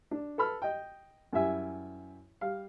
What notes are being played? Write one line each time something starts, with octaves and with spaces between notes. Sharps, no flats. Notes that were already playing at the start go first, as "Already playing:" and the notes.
D4
A4 B4 B5 F6
D#5 G5
F#2 G3 E4 E5 G#5
G3 F5